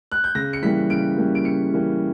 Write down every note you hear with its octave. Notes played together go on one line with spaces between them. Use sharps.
F#6
G6
C#3 A#6
C#7
E3 G3 A#3 C#4 B6
C#3 D7
E3 G3 A#3 C#4
D7
C#3 C#7
E3 G3 A#3 C#4